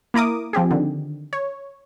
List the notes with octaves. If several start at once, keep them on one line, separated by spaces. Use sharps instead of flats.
A#3 E4 A#4 D6 D#6
F3 C4 G4 G#4
D3 D#3
C#5